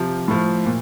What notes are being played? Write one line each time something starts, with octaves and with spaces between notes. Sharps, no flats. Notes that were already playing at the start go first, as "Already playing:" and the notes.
Already playing: C3 F3
A2 F3
A#2